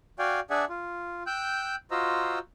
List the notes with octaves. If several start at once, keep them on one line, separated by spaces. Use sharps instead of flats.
F#4 D5 F5 G5 G#5
D4 G#4 D5 E5 F#5 G#5
F4
G5 E6 F#6 G6
F4 F#4 C5 D#5 A#5 E6